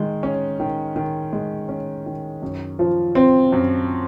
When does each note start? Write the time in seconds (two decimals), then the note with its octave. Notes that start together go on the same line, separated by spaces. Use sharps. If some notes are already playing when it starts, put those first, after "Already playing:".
Already playing: D#3 G#3
0.23 C#4
0.60 D#3
0.96 D#3
1.33 G#3
1.69 C#4
2.06 D#3
2.42 F#2
2.79 F3
3.15 C4
3.52 F#2